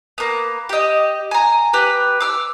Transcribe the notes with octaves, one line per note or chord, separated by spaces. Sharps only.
A#3 B3
G4 D#5
G#5 A#5
G4 B4
D6 E6 F6